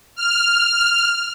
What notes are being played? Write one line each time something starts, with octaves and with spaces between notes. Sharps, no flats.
F6